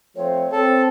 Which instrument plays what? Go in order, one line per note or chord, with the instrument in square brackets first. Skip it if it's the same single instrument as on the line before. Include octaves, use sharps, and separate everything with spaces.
[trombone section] F3 A3 C4 [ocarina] C#5
[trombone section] C4 [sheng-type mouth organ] A4